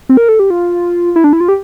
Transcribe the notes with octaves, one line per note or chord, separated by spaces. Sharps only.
C4
A#4
A4
G4
F4
E4
D4
E4
F4
G4